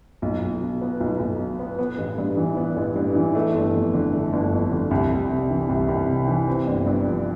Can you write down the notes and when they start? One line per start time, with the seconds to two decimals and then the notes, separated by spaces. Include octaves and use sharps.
0.22 B1
0.42 B1
0.62 B2
0.81 B3
1.00 B1
1.20 B1
1.40 B2
1.59 B3
1.79 B3
1.98 A1
2.18 G2
2.37 E3
2.57 B3
2.76 A1
2.96 G2
3.15 E3
3.35 A3
3.54 G1
3.74 F2
3.94 D3
4.13 A3
4.33 G1
4.52 F2
4.71 D3
4.91 C2
5.10 C2
5.30 C3
5.50 E3
5.69 C2
5.88 C2
6.08 C3
6.28 E3
6.48 C4
6.67 G1
6.86 G2
7.06 F3